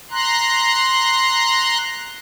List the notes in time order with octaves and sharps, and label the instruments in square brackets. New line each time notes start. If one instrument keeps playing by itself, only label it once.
[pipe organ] A#5 C6 F#6